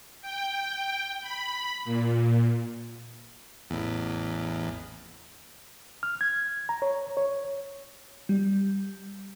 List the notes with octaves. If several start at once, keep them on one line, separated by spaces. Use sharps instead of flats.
G5
B5
A#2
A1 E2
F6
G#6
A#5
C#5
C#5
G3